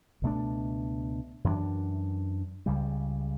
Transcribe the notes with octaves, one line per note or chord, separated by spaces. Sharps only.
C#2 B2 A3 D4
F#2 E3 B3 D4
C#2 C#3 G3